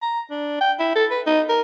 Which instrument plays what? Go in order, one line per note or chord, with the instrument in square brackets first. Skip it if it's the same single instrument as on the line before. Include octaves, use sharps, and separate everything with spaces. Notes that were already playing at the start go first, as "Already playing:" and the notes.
[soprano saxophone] A#5
D4
G5
E4
A4
B4
D#4
A#4